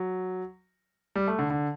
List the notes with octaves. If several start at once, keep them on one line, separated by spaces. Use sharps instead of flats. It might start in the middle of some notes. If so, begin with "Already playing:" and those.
Already playing: F#3
G3
A3
D3
D3